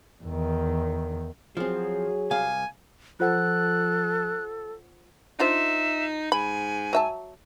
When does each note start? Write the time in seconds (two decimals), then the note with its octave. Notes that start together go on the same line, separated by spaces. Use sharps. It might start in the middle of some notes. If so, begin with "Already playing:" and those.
0.23 E2 D#3
1.57 F3 F#3 C4 G#4
2.31 C2 F5 G#5
3.20 F3 F4 A4 C5 F#5 F#6
5.40 D4 D#4 F4 C5 E5
6.32 G#2 G#5 B5
6.93 F#3 E5 A5